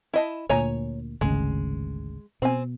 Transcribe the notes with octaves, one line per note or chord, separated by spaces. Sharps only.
E4 D#5 A5
D2 A#2 C#5 G#5 A#5
G#1 D2 C#3 G#3
B2 C4 G#5